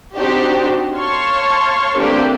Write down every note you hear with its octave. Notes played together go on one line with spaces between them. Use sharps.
C4 D4 D#4 F#4 G4 C5
C#5 F5 A5 C6 C#6
E3 A3 A#3 C4 D4 G4